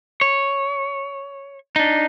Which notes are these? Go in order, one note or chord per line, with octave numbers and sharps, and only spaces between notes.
C#5
D4 D#4